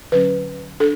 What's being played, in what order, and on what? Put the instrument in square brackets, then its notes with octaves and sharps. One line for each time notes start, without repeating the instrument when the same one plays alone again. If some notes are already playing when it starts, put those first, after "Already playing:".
[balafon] D3 F#3 C#4 B4
D4 A4